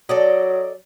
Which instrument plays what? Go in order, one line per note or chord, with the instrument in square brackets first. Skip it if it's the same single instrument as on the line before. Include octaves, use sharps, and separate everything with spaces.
[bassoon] F#3 [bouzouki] A4 D5 D#5